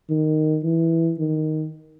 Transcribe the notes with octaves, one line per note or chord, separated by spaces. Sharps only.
D#3
E3
D#3